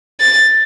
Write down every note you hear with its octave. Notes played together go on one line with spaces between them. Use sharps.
A6